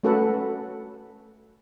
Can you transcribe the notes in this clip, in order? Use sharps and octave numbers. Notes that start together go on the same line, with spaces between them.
A3 C#4 F#4 A4 B4 F#5